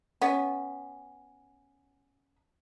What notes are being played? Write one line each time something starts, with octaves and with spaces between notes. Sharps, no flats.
B3 C#4